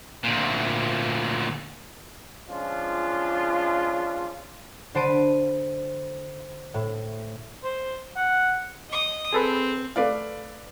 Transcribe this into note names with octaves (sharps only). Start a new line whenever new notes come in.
D2 A#2
F3 G#3 C#4 D4 F4
D3 C5 A5 B5 D7 D#7
A2
C5
F#5
D#5 D#6
C4 G#4 A4 B4
A3 B4 D5 F5